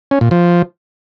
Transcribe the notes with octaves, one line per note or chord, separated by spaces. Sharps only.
C#4
A#2
F3